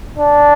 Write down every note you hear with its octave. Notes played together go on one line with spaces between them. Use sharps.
D4